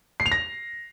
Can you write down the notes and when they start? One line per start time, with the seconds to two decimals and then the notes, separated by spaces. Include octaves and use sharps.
0.20 C7
0.26 F7
0.32 A#6